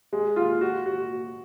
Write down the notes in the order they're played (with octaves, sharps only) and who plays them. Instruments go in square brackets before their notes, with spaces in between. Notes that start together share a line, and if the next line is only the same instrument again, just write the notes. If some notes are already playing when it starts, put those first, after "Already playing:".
[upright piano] G#3
F4
F#4
F#4